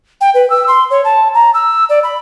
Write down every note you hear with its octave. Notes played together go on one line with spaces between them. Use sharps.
G5
B4
E6
C6
C#5
A5
A#5
E6
D5
B5